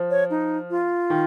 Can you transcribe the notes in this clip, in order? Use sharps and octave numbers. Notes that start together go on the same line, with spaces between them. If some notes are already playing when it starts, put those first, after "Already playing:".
Already playing: F3
C#5
D#4
F4
D#3